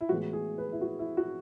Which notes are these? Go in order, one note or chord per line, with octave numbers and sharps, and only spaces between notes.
E4
A2 E3 G#3 B3 F#4
G#4
B4
E4
F#4
E4
F#4